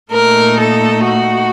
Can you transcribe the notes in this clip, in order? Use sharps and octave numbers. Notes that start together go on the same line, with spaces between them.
A#2 A3 D#4 A#4
A4
F#4